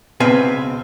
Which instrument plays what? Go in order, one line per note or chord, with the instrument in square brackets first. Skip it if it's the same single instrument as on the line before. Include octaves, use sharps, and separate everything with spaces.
[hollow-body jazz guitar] C#2 B2 C4 B4 G#5